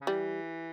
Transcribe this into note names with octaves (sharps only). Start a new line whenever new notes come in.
C#3
E3 G3